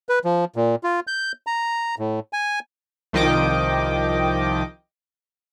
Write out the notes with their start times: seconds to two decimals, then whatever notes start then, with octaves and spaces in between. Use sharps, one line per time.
0.09 B4
0.25 F3
0.56 A#2
0.84 F4
1.07 G6
1.47 A#5
1.99 A2
2.33 G#5
3.13 C2 D#3 F3 D#5 G5 D6